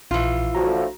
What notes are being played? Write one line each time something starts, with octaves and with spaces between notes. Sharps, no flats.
A#1 E3 F4
D2 A2 F3 F#4 A#5